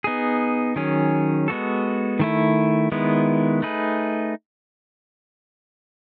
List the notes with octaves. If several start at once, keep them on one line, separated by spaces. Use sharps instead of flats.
B3 D#4 G#4
D#3 F#3 C#4 G#4
G#3 B3 F#4 A4
D#3 A3 E4
D#3 G#3 B3 E4
A3 D#4 G#4 B4